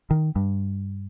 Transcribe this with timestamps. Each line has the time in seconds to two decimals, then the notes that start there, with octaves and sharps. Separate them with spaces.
0.11 D#3
0.36 G2